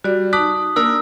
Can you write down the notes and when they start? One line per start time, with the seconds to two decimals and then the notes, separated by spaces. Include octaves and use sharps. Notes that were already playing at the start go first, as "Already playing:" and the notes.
0.04 G3 F#4 D5
0.33 D#4 A5 D6 D#6 F#6 B6
0.76 A#3 D4 A#4 E6